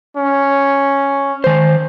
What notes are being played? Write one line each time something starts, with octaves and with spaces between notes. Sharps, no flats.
C#4
D#3 C5